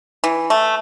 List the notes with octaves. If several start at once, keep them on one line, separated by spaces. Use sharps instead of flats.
E3
A3